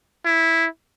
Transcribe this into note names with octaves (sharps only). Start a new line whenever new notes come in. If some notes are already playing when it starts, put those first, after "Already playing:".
E4